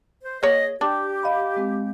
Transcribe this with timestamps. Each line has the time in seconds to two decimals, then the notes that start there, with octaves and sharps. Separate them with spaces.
0.23 C5
0.43 A#3 G#4 C#5 D#5
0.81 D4 G4 G5 D6
1.23 D#5 F5 B5
1.56 G#3 C4